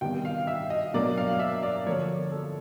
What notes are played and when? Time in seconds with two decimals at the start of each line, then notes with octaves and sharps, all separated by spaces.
0.01 C3 D#3 G3 B3 G5
0.25 F5
0.47 E5
0.70 D#5
0.94 B2 F#3 A#3 D4 D5
1.17 F5
1.39 E5
1.63 D5
1.86 D3 F3 A#3 D4 C#5
2.32 A4